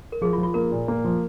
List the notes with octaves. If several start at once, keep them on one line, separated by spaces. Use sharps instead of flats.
A#4
F3 G#4
F4
F3
F4
A#3 A#4
A#2
A#3
F3